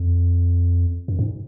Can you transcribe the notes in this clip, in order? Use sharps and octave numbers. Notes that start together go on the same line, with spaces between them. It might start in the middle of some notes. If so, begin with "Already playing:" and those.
Already playing: F2
F#2
G#2